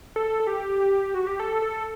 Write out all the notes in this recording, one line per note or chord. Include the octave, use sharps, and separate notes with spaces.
A4
A4
G4
F#4
G4
A4
A4